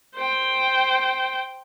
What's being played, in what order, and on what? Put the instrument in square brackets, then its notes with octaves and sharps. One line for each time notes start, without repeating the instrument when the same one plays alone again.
[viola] C5 G5